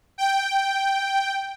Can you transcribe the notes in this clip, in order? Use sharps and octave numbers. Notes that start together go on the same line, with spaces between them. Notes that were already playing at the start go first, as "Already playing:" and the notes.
G5